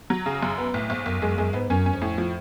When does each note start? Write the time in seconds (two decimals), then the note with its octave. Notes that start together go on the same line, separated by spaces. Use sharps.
0.10 F#3
0.26 C#3
0.43 F#2
0.58 B3
0.74 B1 A2
0.89 B1 G#2
1.06 B1 F#2
1.21 F#2 G#3
1.38 F#2 G#3
1.53 G#2 B3
1.70 F#2 C#4
1.86 C#4
1.93 F2
2.02 A2
2.18 F3